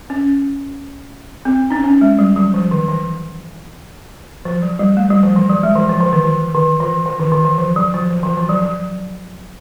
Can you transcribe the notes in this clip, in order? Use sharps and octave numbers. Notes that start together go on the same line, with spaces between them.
C#4
C4
C#4 D#4
C#4
G#3
G3
F#3
F3
D#3
E3
F3
F#3
G3
A3
G3
F3
E3
F#3
G#3
E3
F3
E3
D#3
E3
D#3
E3
E3
D#3
D#3
E3
F3
F#3
F3
F3
E3
F3
F#3
F#3